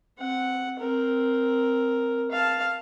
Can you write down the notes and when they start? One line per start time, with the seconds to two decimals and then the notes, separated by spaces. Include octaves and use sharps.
0.18 C4 F#5
0.79 C4 A#4
2.31 F5 A5